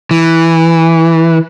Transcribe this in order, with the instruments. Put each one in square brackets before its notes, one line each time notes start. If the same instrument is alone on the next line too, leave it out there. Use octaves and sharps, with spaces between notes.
[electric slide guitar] E3